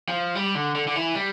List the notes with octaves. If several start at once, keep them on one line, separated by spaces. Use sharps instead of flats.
F3
G3
D3
D3
D3
E3
G3